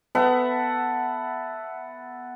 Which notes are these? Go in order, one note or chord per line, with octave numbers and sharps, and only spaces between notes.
B3 A4 E5 F#5